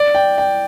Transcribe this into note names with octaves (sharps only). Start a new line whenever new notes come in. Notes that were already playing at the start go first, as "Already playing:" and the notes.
Already playing: D5
G5
G5